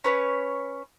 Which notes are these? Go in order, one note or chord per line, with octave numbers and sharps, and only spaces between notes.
C#4 B4 C#5